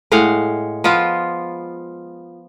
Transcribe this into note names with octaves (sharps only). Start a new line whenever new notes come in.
A2 G#3 F5 F#5
F3 B3 F4